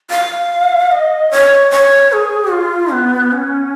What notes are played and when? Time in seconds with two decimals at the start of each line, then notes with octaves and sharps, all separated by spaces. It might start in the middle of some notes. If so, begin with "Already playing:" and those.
0.10 F5
0.92 D#5
1.31 C#5
1.71 C#5
2.12 G#4
2.52 F4
2.92 B3
3.32 C#4